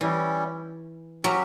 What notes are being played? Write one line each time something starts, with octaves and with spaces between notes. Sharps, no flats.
E3 G3 C#4 E4
F#3 C#4 G4 A#4 E5